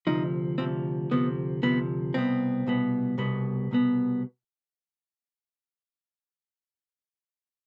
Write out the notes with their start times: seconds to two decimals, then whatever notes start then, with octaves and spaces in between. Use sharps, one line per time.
0.07 D2 C3 F3 D#4
0.58 D2 C3 F3 C4
1.11 D2 C3 F3 B3
1.63 D2 C3 F3 B3
2.14 C2 B2 B3 C4
2.67 C2 B2 B3
3.18 C2 B2 B3
3.71 C2 B2 B3